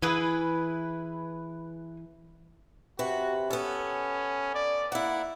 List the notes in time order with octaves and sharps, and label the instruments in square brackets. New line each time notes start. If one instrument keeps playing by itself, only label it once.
[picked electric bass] E3 [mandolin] E4 G#4 B4
[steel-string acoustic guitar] C3 B4 [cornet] F#4
[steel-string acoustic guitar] B3 A4 [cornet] C#4
[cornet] D5
[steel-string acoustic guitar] A#3 E4 [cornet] F#5